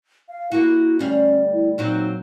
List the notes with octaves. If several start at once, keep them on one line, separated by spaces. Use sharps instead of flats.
F5
A#3 E4 F#4
D2 G3 C#4 F5
E4
A#2 F#3 C4 D#4